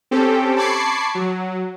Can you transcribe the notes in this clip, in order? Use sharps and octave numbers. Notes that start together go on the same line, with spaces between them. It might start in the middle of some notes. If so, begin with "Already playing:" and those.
C4 C#4 G4 A4
A5 B5 C#6 D6 G#6 C7
F#3